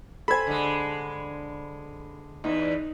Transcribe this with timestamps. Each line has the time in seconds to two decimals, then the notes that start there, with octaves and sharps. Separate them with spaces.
0.28 A4 C5 G#5 B5 G#6
0.47 D3 G#3
2.44 E2 E3 D#4